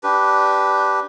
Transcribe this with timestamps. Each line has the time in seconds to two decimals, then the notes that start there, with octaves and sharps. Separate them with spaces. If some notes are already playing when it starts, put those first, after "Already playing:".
0.03 D4 G4 B4